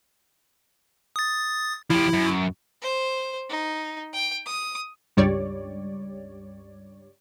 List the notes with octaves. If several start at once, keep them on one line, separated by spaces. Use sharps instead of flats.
D#6 A6
F3 E4 G4
F#2
C5
D#4
G5
D#6
C#2 G2 G3 C#5 D5